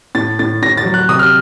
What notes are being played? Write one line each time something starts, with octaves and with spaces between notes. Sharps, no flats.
A2 A6
A2 A6
A2 A#6
A6
F#3
F#6
C3 D#6
F6